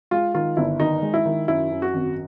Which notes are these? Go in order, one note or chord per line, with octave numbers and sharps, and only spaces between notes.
G#3 F4
D#3 F4
G1 E4
D#3 D#4
G#3
E4
D#3
F#2 E4
F#2
F#4
G#1